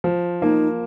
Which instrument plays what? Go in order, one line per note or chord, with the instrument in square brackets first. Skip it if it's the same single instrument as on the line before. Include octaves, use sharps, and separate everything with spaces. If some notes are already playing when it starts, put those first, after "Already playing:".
[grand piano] F3
[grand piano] A#3 [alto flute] D#4